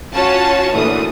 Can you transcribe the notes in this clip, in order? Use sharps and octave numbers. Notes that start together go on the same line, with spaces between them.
C#4 F4 F#4 C#5 A5
D2 A#2 E3 D#6